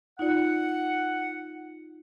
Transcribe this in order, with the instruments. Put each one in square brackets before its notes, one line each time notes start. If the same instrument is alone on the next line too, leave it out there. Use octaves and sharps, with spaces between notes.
[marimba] D#4 F4 D5 [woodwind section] F#5